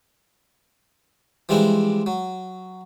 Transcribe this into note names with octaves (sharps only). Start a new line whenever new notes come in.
E3 F3 G3 G#3 C4 D4
F#3